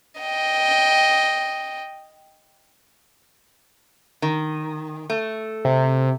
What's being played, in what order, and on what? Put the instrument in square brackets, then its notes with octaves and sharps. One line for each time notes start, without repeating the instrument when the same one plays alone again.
[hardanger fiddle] D#5 G5
[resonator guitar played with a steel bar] D#3
A3
[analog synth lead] C3